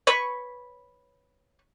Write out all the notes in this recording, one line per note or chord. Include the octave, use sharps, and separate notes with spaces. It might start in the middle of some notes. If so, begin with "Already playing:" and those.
B4 C#5 B5 C#6